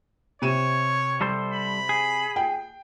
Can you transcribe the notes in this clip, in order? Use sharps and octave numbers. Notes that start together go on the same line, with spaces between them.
C3 C#5 D#7 E7
G3 A4 C5
B5
G#4
G5